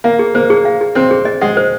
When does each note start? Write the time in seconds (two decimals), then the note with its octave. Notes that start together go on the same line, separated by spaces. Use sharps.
0.04 A#3 F5
0.19 G#4
0.35 A#3 C5
0.50 G#4
0.65 F5
0.81 G#4
0.95 C4 C5
1.11 G#4
1.25 D#5
1.41 G#3 F#5
1.57 C5